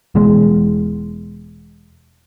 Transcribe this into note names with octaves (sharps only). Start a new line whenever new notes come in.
E1 E2 G#3